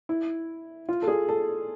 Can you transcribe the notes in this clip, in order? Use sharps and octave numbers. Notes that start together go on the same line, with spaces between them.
E4
F4
A4
G#4
A4